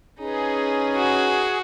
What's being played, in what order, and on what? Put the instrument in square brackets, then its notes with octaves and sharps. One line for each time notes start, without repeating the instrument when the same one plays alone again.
[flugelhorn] C#4 [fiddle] D#4 B4 [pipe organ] G#4
[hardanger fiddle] F#4